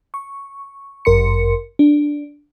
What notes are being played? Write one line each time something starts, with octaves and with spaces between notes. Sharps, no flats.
C#6
G1 F#2 A#4 C6 C#7
D4